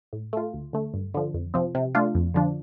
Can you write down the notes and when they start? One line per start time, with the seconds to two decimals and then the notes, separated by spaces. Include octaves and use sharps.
0.13 A2
0.33 A3 F4
0.54 D2
0.73 D3 A3
0.94 G2
1.14 D3 F3
1.34 F2
1.54 C3 F3 C4
1.75 C3
1.95 A3 D4 F4
2.15 F2
2.34 D3 F3 D4